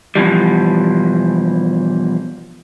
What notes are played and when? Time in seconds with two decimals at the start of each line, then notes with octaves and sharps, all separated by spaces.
0.15 B2 E3 F3 G3